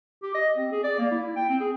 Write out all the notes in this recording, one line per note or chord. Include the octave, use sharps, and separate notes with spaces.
G4
D#5
C4
G#4
D5
A#3
E4
E4
G5
C4
G#4